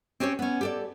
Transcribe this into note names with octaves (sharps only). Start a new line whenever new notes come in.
C4 C#4 G4 C5 C#5
B3 C#4
G4 A4 D5